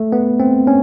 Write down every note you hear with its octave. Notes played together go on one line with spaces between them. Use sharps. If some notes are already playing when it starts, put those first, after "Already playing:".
Already playing: A3
B3
C4
C#4